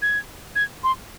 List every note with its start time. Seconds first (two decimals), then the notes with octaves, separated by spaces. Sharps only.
0.02 G#6
0.56 G#6
0.84 C6